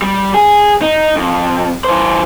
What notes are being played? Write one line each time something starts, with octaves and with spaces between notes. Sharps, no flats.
G3
G#4
D#4
F2
E3 C5